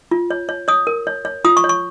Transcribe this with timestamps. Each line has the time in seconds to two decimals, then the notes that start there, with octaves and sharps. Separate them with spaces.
0.11 F4
0.30 C#5
0.49 C#5
0.68 C#5 D#6
0.87 A#4
1.07 C#5
1.25 C#5
1.45 F4 D#6
1.57 C#6
1.64 C#5
1.69 C#6